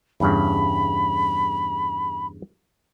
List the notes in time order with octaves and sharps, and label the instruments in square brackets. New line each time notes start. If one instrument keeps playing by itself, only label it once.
[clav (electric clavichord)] E2 G2 C#3 [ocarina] B5